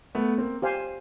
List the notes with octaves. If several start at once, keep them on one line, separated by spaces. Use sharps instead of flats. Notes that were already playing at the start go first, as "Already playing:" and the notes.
A3 B3
A#3 C4
G4 C5 F5 G#5